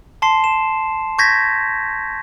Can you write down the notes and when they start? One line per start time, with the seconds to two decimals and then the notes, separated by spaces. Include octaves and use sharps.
0.22 A5 C6 C7
0.44 E7
1.19 C#6 G6 G#6 A#6 B6